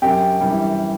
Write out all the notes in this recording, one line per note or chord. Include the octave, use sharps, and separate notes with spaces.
F#2 G4 G5
E3 G3